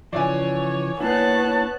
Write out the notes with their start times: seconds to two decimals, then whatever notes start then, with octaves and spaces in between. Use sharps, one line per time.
0.13 C#3 E3 F3 C#5 D5 E5 G#5
1.00 A#3 B3 D4 E4 C#5 A5 F#6